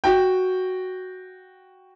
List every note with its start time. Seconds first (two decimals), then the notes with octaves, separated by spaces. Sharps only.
0.04 F#4 G5